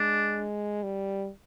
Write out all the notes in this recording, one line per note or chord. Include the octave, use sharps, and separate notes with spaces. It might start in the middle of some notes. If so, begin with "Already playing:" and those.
Already playing: G#3 D4
G3